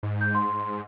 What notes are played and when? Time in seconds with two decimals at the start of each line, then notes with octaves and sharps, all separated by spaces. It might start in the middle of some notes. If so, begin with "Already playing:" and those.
0.03 G#2
0.21 G6
0.35 C6